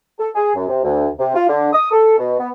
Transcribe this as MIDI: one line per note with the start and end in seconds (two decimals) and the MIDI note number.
0.19 0.29 69
0.35 0.55 68
0.55 0.66 42
0.68 0.79 48
0.84 1.08 38
1.19 1.34 48
1.35 1.48 65
1.48 1.68 50
1.73 1.89 87
1.91 2.18 69
2.18 2.37 47
2.39 2.49 59